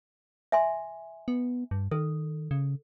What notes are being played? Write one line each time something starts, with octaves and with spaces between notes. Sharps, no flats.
E5 G#5 C6
B3
G2
D#3 A4
C#3